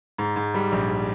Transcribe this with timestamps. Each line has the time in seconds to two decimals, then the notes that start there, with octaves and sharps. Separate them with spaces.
0.18 G#2
0.36 G#2
0.54 G3
0.72 A#1